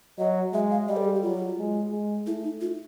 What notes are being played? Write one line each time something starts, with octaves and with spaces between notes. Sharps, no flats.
F#3 D#5
G#3 E5
F5
G3 D#5
A4
G#4
G4
F#3 F4
G#3
G#3
A3 E4
D#4
F4